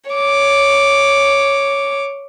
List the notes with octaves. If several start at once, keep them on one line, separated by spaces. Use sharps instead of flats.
C#5 D6